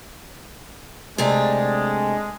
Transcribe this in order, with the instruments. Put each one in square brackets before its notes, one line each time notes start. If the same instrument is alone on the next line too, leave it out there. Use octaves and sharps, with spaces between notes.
[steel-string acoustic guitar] C3 A3 D4 [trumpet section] G#3